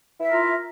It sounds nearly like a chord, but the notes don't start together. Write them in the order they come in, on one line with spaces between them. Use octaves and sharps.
E4 E5 A#4 F4